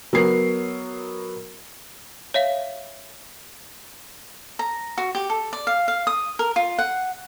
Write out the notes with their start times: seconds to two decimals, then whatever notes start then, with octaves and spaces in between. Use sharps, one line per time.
0.13 F#3 B3 A#4 C7
2.34 C#5 E5 F5
4.59 A#5
4.98 F#4
5.15 G4
5.30 A4
5.53 D5
5.67 F5
5.88 F5
6.07 D#6
6.39 A#4
6.56 F4
6.79 F#5